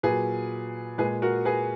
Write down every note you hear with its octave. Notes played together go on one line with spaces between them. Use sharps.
A#2 F#3 G#4 B4
A#2 G#3 G#4 B4
F#4 A#4
G#4 B4